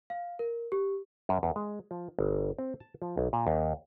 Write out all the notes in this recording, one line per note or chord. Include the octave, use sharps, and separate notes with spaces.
F5
A#4
G4
F#2
E2
G#3
F3
G1
C4
A5
F3
B1
A#2
D#2